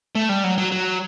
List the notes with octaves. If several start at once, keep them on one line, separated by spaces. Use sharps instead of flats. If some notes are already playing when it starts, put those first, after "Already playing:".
A3
G3
F#3
F#3
F#3